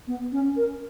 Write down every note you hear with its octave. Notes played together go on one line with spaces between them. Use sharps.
B3
C#4
A#4